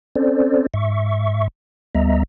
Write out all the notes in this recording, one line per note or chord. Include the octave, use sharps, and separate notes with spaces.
C4 C#4 A4 C5 D5
G#2 E5 C#6
D2 G3 B3 D#5 E5 A#5